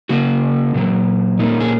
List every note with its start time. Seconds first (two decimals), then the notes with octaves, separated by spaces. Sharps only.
0.09 C#3 A#3 C#4 F#4
0.74 A#2 F#3 A#3
1.39 A#2 A#3 C#4 D#4
1.60 G#4